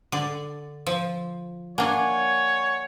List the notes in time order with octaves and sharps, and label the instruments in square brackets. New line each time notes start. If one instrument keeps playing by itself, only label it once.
[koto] D3 D5
F3
[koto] A#3 D4 [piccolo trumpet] C#5 [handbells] F#5 G#5